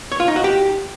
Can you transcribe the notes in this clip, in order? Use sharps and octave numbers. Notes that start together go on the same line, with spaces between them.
C#5
F4
D#4
F#4
G4